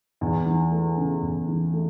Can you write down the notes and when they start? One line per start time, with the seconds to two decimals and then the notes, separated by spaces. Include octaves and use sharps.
0.21 E2
0.46 E3
0.71 A3
0.97 C#3
1.22 E2
1.48 E3
1.73 A3